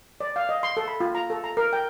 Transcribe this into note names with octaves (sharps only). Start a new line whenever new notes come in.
D5
F5
D#5
C6
A4
B5
F4
A#5
A4
A#5
A#4
G5